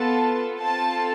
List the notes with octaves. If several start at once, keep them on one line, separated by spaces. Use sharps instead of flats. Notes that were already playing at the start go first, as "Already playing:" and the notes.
Already playing: B3 F4 A4 A5
C4 F4 A4 A5